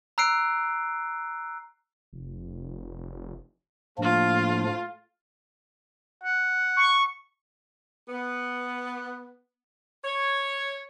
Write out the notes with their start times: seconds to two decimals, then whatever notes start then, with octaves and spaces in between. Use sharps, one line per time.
0.18 A#5 E6 F#6 C7 D7
2.13 F1
3.98 A2 F3 A3 A#3 D4 F4
6.24 F#5
6.77 C#6
8.09 B3
10.04 C#5